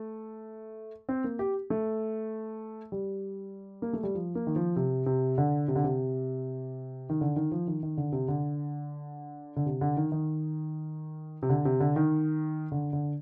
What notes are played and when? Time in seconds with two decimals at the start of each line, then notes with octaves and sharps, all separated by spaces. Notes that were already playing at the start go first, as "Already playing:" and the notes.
Already playing: A3
1.09 C4
1.24 A#3
1.39 G4
1.70 A3
2.92 G3
3.82 A#3
3.93 A3
4.03 G3
4.15 F3
4.35 A#3
4.47 D#3
4.56 F3
4.76 C3
5.06 C3
5.38 D3
5.68 C3
5.76 D3
5.84 C3
7.10 D#3
7.21 D3
7.36 D#3
7.52 F3
7.67 D#3
7.83 D#3
7.97 D3
8.12 C3
8.28 D3
9.56 D3
9.66 C3
9.81 D3
9.97 D#3
10.12 D#3
11.42 C3
11.50 D3
11.65 C3
11.80 D3
11.96 D#3
12.72 D3
12.93 D3